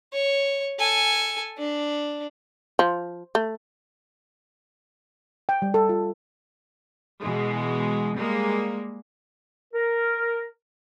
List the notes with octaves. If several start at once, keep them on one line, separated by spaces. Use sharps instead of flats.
C#5
A4 G#5
D4
F3
A3
G5
G3
A4
F4
B2 E3 G#3
G3 G#3 A#3
A#4